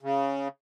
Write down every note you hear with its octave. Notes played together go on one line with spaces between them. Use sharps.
C#3